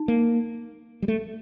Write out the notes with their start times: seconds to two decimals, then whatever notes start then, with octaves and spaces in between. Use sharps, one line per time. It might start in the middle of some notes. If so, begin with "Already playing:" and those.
Already playing: D#4
0.08 A#3
1.02 G3
1.08 A3